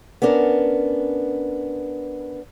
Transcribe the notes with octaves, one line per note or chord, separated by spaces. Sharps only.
B3 C#4 D4 A#4